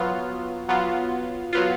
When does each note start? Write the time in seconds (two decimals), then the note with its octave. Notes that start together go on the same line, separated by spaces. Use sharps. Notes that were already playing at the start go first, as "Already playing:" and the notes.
Already playing: F#3 B3 F4
0.69 F#3 B3 F4
1.53 F#3 B3 F4